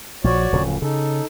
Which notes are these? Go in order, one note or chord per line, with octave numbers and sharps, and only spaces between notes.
A#1 F3 F#4 C#5 D5
D1 C#3 F3
C#3 D#4 A4